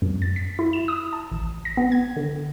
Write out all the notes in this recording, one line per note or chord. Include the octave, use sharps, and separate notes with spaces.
F#2
A6
B6
E4
E7
D#6
A5
A1
A#6
B3
G#6
D3